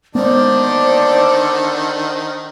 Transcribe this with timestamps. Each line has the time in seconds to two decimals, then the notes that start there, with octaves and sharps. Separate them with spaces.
0.15 D3 D#3 G#3 A#3 B3 D4 C5 D5